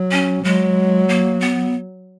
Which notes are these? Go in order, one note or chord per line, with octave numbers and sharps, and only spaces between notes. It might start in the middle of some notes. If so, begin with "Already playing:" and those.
Already playing: F#3
C#4
F#3 G#3
A#3
B3